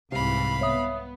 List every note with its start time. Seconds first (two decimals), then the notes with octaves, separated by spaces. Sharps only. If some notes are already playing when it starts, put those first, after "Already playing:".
0.12 C2 G#2 C3 E3 F5 B5
0.61 B3 C#5 E5 D#6